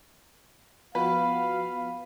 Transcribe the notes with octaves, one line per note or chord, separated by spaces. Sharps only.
F3 B3 F#4 B4 F5